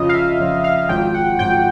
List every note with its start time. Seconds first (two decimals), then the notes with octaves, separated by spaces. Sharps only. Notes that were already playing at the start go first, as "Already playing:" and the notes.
Already playing: F2 C#3 F3 D#5
0.09 F5
0.14 E5
0.39 F2 C#3 F3
0.64 F5
0.89 G#1 G#2 F3 G5
1.14 F#5
1.39 G#1 G#2 F3 G5